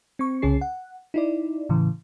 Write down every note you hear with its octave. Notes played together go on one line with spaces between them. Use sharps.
C4 C#6
C2 C#3 C#4 G#4 C7
F#5
D#4 E4 D5
A2 C#3 E3